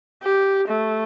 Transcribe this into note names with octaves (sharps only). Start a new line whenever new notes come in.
G4
A3